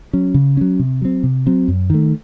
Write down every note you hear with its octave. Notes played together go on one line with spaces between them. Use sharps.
F#3 C#4
C#3
F#3 C#4
C3
F#3 C4
C3
F#3 C4
F#2
D#3 A3